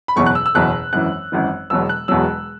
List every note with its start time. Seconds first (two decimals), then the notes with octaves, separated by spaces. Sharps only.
0.08 B5
0.16 F#1 E2 B2 F#3 C#6
0.26 F#6
0.35 E6
0.46 E6
0.55 F#1 E2 B2 F#3 F#6
0.93 G#1 F#2 E3 F#6
1.32 G#1 F#2 E3
1.70 E1 E2 B2 F#3 E6
1.89 F#6
2.08 E1 E2 B2 F#3 E6